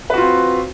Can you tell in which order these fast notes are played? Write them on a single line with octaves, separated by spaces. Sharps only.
B4 F#4 F4 C4